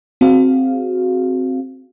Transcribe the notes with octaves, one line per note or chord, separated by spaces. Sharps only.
C4 F#4 G#4 F5